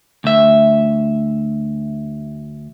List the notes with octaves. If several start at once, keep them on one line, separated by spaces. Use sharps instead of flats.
D2 E5